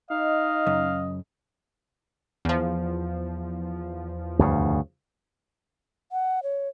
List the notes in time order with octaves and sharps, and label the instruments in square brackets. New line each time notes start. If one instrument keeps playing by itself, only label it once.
[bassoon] D#4 [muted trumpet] D#5 [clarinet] F5
[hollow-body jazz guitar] F#2 C#3
[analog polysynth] E2 F3
[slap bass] D2 G2 C#3
[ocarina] F#5
C#5